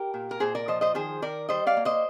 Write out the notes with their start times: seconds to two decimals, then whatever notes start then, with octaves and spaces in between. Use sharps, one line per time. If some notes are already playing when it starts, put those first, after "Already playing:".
Already playing: G4 A#4
0.14 A#2
0.31 A#4
0.40 A#2 G#4 C5
0.55 A#4 D5
0.68 F3 C5 D#5
0.81 C5 D#5
0.94 D#3 G#4 C5
1.22 D#3 A#4 D5
1.49 G3 C5 D#5
1.67 D5 F5
1.77 A#3
1.85 C5 D#5